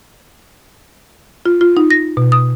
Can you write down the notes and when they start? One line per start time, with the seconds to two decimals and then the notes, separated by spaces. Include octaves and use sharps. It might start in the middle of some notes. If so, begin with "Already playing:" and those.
1.45 F4
1.61 F4
1.77 D#4
1.91 A#6
2.17 B2
2.32 D#6